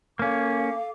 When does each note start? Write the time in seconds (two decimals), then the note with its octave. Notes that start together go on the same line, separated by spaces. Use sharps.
0.19 A#3 C#4 A4 F5 D6